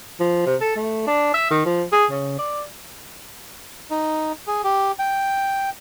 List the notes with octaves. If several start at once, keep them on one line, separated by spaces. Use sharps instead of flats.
F3
C3
A4
A3
D4
E5
D#3
F3
G#4
C#3
D5
D#4
G#4
G4
G5